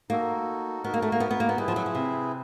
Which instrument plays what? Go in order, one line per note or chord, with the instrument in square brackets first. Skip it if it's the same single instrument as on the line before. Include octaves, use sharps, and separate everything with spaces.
[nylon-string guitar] A#3 [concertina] D#4 F#4 A4
[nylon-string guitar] B3 [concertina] D#4 F#4 A#4
[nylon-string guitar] A#3
A3
A#3
B3
B3
A#3
B3
[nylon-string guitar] G3 [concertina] E4 G#4 B4
[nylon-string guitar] F3
F#3
F3
C3